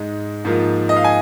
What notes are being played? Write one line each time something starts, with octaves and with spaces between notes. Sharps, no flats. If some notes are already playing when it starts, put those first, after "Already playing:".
Already playing: G#2 G#3 D#4
G#2 F3 A#3 F4
D#5
F5
G#5